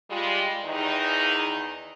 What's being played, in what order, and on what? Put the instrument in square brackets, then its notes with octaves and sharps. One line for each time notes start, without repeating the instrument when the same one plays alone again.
[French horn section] G3 G#3 F4
E2 D#3 D#4